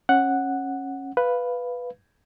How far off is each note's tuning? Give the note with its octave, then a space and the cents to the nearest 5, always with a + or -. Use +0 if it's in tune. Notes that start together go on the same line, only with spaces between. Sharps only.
C#4 -20 F#5 +0
B4 +0 F5 +0